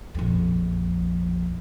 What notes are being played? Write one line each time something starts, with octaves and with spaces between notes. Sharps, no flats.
A#1 F2